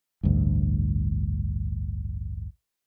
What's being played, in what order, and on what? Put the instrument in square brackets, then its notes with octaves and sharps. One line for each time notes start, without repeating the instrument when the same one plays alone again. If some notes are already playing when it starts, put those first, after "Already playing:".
[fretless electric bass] A1 D2 G2